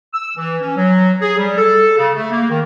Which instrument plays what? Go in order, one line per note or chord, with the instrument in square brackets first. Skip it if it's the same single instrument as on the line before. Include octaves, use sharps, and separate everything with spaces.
[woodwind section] E6
E3
C#4
F#3
G#4
G3
A4
C#3
A3
A#3
D#3